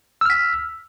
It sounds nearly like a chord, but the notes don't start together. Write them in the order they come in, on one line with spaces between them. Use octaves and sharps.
E6 F6 B6